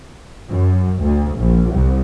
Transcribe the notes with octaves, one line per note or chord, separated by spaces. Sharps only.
F#2
D2
A#1
C2